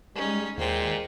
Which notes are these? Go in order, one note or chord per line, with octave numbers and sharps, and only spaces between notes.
G3 G#3 C#4 D#4
D#2 A#2 G#3 C5 G5